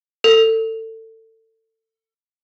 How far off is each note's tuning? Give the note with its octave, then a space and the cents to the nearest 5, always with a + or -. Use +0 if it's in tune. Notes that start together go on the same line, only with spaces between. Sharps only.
A4 +25